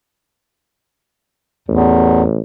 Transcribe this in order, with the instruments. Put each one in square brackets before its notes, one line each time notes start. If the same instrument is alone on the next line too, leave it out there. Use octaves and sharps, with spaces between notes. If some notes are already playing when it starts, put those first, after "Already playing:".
[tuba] A1 [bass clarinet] E2